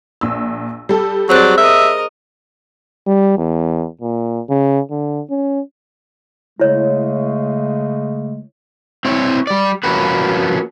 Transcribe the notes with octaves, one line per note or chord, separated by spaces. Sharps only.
A#1 E6
G3 A4
F#3 C4 G#4 C5 D5 F#6
A#4 D#5 E5
G3
E2
A#2
C#3
D3
C#4
C#3 G#3 A3 E4 C#5
C4 E4 C#5
G3 D5
F3 A#3 C#4 F#4 G4 B4